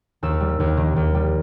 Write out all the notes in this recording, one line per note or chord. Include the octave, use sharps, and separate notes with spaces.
D#2 E6
G3
D#2
D#3
D#2
G3